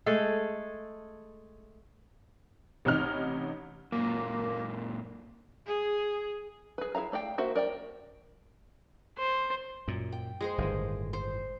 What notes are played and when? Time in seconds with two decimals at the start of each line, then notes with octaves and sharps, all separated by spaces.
0.06 G#3 A3 G#4 A4
2.85 A1 C3 C#4 D#4 F6
3.92 F#2 A#2 A#3
5.66 G#4
6.78 G#4 B4
6.95 E4 G#4 F5 A#5
7.12 A3 D5 F5 G5
7.38 A#3 F#4 C5 E5
7.55 A#4 D5 F5 G5
9.18 C5
9.88 F#2 A#2
10.12 G5
10.41 G#3 G#4 C5
10.58 G1 A2 D#3
11.13 C5